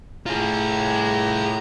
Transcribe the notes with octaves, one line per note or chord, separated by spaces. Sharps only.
A2 F4 G#4 A#5